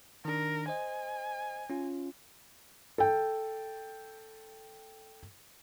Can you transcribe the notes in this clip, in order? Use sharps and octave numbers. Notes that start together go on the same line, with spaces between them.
D#3 D4 A#4
C5 D#5 G#5
C#4 F4
A4 G5